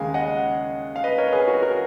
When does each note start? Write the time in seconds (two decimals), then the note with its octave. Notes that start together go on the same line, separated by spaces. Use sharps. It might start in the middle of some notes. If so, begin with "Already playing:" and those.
Already playing: D#2 C#3 G#3 F5 G#5
0.14 D#5 F#5
0.96 F5
1.04 B4 D#5
1.18 A#4 C#5
1.33 G#4 B4
1.48 F#4 A#4
1.62 F#4 A#4